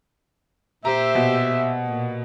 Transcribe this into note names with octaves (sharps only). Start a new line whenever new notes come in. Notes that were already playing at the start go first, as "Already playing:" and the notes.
A#2 G4 C5 E5 A#5
B2
A#2